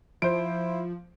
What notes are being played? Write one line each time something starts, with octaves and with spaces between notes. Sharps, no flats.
F3 E4 C5 D7